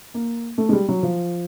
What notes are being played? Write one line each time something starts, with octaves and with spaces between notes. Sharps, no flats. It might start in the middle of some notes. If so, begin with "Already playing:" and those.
A#3
A3
G#3
G3
F#3
F3